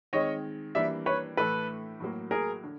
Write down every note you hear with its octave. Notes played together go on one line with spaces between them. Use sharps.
D#3 G#3 C4 C#5 D#5
E3 G3 A#3 D4 D5 E5
B4 C#5
A2 E3 A3 A4 B4
A2 F#3 A#3
G#4 A#4
D3